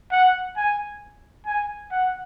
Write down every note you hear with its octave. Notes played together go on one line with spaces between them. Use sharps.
F#5
G#5
G#5
F#5